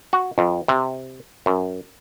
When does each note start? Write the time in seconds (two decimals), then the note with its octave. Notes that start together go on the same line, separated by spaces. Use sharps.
0.13 F#4
0.38 F2
0.68 C3
1.46 F#2